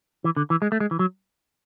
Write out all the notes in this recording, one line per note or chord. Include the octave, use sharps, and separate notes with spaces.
E3
D3
E3
G#3
A3
G#3
E3
F#3